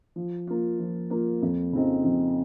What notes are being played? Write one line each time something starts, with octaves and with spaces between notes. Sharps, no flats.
F3
A#3 F4
F3
A#3 F4
F2
C#3 F3 C4 D#4
F2